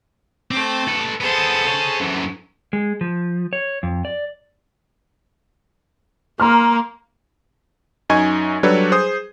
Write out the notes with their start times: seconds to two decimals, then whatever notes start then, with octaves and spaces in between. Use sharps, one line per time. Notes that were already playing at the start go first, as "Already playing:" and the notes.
0.51 A3 C4 D6
0.88 A4 B4
1.21 B3 G#4 A4 C5
1.67 G#4 C#5
2.00 F#2 E3
2.73 G#3
3.01 F3
3.53 C#5
3.83 F2
4.05 D5
6.40 A#3 A#5 C6 F6
8.10 F#2 D#4 D#5 G#5 C#6 G#6
8.63 F#3 G3 D4 A4 B4 C#5
8.91 G#4 C5 D#6